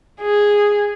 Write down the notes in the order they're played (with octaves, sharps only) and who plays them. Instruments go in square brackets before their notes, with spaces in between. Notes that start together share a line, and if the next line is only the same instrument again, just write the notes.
[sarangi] G#4